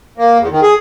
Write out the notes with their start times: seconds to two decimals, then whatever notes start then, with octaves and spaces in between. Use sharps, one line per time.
0.18 A#3
0.38 E2
0.50 D#3
0.62 G#4